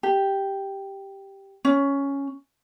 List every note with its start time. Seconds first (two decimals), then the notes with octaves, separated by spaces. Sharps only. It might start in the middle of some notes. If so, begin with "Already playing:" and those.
0.03 G4
1.65 C#4